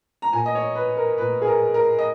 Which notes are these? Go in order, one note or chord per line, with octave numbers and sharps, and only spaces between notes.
A#5
A#2 G#5
D#5
C#5
B4
A#4
A#2 B4
G#4
A#4
A#4
D#5